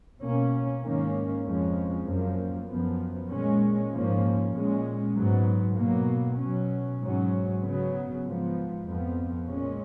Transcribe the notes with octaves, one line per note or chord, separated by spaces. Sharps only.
B2 A#3 C#4
G#2 D#3 A#3 C#4
F2 F3 G#3 C#4
F#2 F3 A#3
F#2 F3 B3
A#2 G#3 C#4
G#2 F3 A#3 C#4
A#2 G#3 C#4
G#2 F#3 B3
B2 F#3 A#3
B2 F#3 C#4
G#2 F#3 C#4
C#3 F#3 B3
G#2 F3 B3
F2 F3 B3
A#2 G#3 C#4